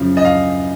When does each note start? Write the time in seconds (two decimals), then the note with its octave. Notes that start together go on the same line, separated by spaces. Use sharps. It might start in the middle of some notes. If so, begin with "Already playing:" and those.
Already playing: F#2 C#3 F3
0.17 D#5
0.25 F5